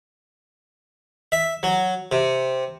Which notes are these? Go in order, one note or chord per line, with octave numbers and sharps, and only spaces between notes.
E5
F#3
C3